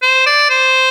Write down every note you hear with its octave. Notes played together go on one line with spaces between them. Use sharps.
C5
D5
C5